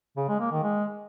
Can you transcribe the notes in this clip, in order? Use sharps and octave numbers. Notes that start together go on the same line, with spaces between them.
C#3
G#3
A#3
D#3
G#3